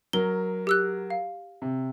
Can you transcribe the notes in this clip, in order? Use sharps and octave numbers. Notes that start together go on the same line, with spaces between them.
F#3 A#4 G7
G4 E6 F#6
F5
C3